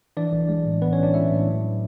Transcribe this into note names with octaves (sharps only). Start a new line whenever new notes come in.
E3 D4 D5
B1
G#3
A2
E3 B3 B4
B1 C#4 C#5
D4 D5
G#3 E4 E5
A2
F#3